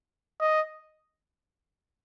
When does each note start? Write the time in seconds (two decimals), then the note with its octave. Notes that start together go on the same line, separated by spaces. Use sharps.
0.41 D#5